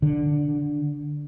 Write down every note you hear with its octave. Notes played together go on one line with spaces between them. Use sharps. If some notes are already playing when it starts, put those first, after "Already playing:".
D3